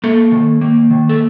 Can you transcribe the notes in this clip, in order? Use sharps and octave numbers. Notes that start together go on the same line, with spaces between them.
A#3 A4
D#3
A#3
D#3
A4